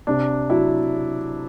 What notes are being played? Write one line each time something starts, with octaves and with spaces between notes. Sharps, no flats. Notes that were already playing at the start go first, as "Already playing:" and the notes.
C3 D4
F#3 E4